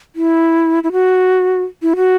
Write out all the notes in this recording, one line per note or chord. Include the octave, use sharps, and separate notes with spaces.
E4
E4
F#4
E4
F#4